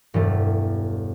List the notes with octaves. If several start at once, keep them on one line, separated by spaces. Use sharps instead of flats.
E1 G2 A3